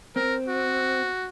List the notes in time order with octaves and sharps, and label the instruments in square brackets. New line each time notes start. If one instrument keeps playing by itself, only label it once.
[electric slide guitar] C4 [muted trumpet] A#4
[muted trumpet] F#4